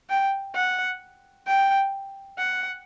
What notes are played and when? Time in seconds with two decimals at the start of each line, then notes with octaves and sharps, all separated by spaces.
0.10 G5
0.55 F#5
1.46 G5
2.38 F#5